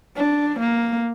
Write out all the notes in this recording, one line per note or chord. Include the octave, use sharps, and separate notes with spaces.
D4
A#3